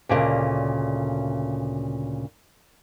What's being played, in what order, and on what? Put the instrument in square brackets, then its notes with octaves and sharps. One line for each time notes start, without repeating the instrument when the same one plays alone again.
[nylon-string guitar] D2 A#2 C#3 D#5